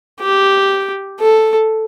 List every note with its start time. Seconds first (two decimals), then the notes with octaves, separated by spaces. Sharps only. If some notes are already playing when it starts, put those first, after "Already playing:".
0.21 G4
1.20 A4